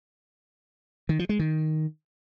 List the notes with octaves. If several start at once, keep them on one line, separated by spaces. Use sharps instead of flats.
D#3
F3
G#3
D#3